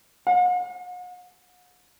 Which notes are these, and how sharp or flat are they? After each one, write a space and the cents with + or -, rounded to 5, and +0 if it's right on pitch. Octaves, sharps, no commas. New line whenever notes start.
F#5 -45